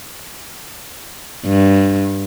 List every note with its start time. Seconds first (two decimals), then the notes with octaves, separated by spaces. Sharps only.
1.46 G2